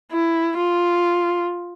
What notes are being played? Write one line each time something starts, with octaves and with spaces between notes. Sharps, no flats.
E4
F4